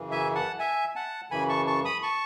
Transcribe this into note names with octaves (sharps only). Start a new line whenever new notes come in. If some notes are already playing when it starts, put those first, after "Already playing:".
Already playing: F#2 C#3 E3
E5 G#5
F#5 A5
E5 G#5
F#5 A5
F#2 C#3 E3 G#5 B5
A5 C#6
A5 C#6
B5 D#6
A5 C#6